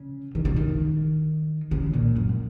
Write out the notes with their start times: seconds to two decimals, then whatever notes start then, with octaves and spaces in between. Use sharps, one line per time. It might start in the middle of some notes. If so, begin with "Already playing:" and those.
Already playing: C#3
0.35 D#3
0.45 C#3
0.56 D#3
1.71 C#3
1.94 A#2
2.16 F#2